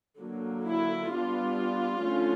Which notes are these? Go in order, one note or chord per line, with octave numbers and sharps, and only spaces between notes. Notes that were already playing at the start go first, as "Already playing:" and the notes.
D3 F#3 A#3
E4
G3 B3 D4 F4
D3 F3 A3 C#4